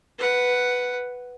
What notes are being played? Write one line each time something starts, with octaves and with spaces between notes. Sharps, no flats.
B4 F#5